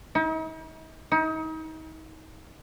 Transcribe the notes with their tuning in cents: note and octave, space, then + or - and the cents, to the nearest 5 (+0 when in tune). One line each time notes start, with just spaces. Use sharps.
D#4 +45
D#4 +35